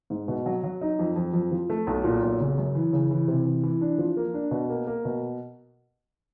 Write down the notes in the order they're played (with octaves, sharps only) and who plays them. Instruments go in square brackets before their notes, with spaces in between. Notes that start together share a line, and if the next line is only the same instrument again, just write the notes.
[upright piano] G#2
B2
F#3
F#3
D#4
F2
F2
F2
F3
A3
B1
A#2
B1
C#3
F#2
E3
C#3
E3
C3
E3
E3
D4
F3
A#3
D4
B2
A#3
A#3
B2